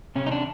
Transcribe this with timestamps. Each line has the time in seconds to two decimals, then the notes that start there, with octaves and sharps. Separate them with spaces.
0.16 C3 C#4
0.26 D#4
0.31 D4